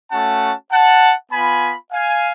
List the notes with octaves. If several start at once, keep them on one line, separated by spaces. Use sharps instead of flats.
A3 C#4 F#4 F#5 A5
F#5 A5
B3 F4 G#5 B5
F5 G#5